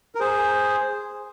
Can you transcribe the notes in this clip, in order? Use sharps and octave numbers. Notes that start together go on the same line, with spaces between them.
A#4
G#4 C5